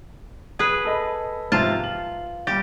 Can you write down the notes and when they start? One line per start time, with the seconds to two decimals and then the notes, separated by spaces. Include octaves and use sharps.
0.59 G#4 B4
0.85 A4 D#5 B5
1.52 G#2 C3 F3 F4 A5
1.84 F#7
2.47 G3 G4 A6